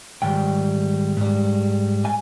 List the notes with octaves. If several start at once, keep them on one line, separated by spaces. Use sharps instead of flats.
G#2 D#3 G3 G5
G#2 G3
G#5